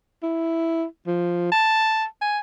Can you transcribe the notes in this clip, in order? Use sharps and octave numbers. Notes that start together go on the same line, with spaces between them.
E4
F3
A5
G#5